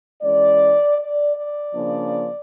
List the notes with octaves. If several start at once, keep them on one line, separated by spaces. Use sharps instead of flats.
E3 G#3 C#4 D5
D5
D5
C#3 F3 A#3 D4